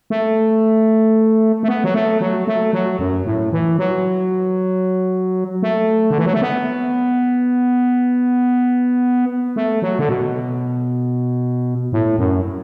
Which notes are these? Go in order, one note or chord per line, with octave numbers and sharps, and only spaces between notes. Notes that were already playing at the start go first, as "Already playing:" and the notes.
A3
A3
B3
F#3
A3
F#3
A3
F#3
F#2
A2
E3
F#3
A3
D3
E3
F#3
A3
B3
A3
F#3
D3
B2
A2
F#2